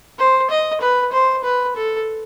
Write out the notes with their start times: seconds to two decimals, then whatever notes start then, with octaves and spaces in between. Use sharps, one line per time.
0.18 C5
0.50 D#5
0.81 B4
1.13 C5
1.44 B4
1.76 A4